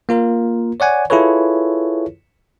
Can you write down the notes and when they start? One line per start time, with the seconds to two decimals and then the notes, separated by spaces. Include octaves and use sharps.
0.09 A#3 F4 A#4
0.80 C#5 D5 F#5 G#5
1.10 E4 F4 G#4 A4 B4 C#5